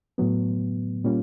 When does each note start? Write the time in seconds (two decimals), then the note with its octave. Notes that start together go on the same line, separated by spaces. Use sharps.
0.18 A2 F#3 B3
1.04 A#2 G3 A#3 C#4 F4